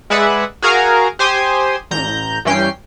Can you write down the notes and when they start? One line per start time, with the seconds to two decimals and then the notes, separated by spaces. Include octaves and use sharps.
0.10 G#3 G#4 B4 D5 E5 F#5
0.62 F#4 G#4 A#4 F5 G#5 A#5
1.19 G4 C5 G#5 C6 D#6
1.91 A1 A#5 G6
2.45 G2 E3 C#4 G5 C7